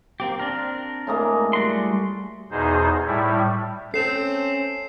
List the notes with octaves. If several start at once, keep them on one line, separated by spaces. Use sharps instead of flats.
A#3 C4 G4
C4 D4 A#4
A2 G#3 A#3
G3 F#4 C6
E2 B2 D#4 G#4 C5
A2 G3 E4
C4 C#4 A4 C7 E7